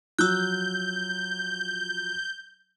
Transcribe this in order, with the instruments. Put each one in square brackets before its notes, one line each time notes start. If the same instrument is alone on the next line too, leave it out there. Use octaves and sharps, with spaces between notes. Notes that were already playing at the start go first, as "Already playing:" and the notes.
[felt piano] F3 F#3 [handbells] E6 F#6 [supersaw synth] G6